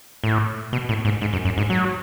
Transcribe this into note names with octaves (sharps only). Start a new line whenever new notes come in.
A2
B2
A2
G#2
G#2
F#2
F#2
G#2
F#3